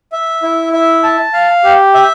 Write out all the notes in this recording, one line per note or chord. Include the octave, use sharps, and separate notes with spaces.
E5
E4
E5
A5
F5
G4
E5